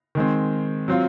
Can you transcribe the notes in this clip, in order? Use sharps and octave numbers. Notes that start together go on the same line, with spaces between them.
D#3 G#3 C4
F#3 C4 F4